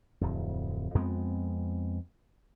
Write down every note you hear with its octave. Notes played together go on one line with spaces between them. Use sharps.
D1 F2
F2 G#3 B3 C4